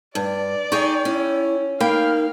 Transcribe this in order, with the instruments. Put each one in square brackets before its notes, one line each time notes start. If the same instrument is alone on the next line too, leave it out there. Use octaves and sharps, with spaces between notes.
[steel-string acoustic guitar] G2 [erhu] D5
[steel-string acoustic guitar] D#4 G#4 [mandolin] C#5 G5
[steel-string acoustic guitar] C#4 [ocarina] E4
[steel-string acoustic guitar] A#3 [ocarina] D#4 [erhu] F5 [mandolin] G5 B5